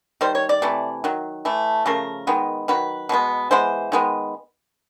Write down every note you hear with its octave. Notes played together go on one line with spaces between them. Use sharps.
D#3 G3 C5
C#5
D5
C3 E3 A3
D#3 F#3
E3 A3
C#3 F3 A3 A#4
D#3 G#3 B3
D#3 F#3 B4
B2 G#3 B3
E3 G#3 B3 C5
D#3 G#3 B3